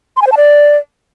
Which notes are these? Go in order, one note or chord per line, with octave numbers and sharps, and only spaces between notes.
C6
G#5
C5
A5
D5